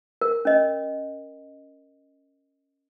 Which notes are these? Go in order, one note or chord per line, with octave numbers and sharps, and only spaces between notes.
A#4
C#4 D#5